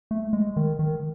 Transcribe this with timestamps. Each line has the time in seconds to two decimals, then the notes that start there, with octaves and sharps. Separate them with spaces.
0.11 A3
0.33 G#3
0.56 D#3
0.79 D#3